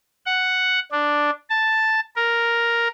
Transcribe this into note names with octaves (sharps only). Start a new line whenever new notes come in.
F#5
D4
A5
A#4